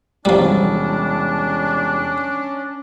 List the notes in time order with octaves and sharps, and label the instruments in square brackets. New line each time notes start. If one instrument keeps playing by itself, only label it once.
[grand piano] E1 C2 [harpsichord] F3 G3 [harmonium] C#4 [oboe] D4